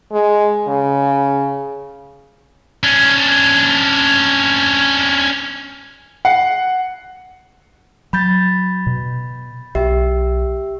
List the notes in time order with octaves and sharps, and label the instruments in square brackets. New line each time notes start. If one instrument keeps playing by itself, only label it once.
[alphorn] G#3
C#3
[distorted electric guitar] C#4 D4
[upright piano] F#5 C7 C#7
[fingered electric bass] F#3 [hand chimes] B5 G6 A6
[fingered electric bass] B2
[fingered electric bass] B1 [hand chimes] G4 E5